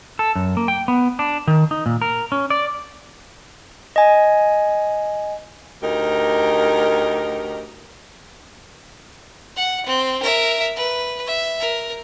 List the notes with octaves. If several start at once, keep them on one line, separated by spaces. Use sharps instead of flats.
A4
F#2
A#3
G5
B3
D4
D#3
D#4
A#2
A#4
C#4
D5
D#5 G#5
D2 D#4 G4 A#4
F#5
C4
A#4 E5
B4
E5
A#4